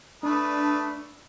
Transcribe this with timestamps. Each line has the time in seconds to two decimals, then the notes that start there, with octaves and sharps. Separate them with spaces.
0.23 A3 D4 B4 D#6